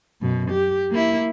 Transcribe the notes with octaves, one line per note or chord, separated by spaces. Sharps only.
F#2 B2
G4
A#3 E4